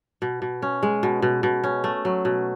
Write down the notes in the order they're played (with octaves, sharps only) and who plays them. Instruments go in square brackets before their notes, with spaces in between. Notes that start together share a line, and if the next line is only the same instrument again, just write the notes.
[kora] B2
B2
C#4
G#3
B2
B2
B2
C#4
A3
F#3
B2